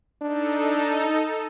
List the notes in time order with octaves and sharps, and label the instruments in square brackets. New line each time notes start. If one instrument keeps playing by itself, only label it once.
[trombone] D4 [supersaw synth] D#4 A4